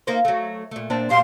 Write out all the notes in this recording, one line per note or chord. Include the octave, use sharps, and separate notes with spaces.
A#3 D#4 C5
F#3 A3
A#2 A3
A#2 C4 D4
F#2 A#2 G4 F5 C6